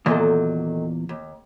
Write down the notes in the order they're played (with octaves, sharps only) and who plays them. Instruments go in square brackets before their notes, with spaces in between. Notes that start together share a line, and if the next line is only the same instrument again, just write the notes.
[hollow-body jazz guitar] E2 A#2 [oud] D#3 F#3 A4
[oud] D#2